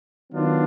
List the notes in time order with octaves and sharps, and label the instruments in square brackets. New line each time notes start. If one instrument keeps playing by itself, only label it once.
[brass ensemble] D#3 F#3 B3 D4 F4